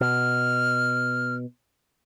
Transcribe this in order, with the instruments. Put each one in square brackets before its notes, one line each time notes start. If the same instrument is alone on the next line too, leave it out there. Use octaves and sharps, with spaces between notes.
[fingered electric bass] B2 [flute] F6